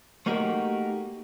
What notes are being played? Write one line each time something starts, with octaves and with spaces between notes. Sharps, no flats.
A3 A#3 D#4 F#4 G4 A#4